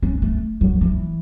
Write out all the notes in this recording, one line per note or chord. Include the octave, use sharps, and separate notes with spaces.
C#4
A3
F#3
E3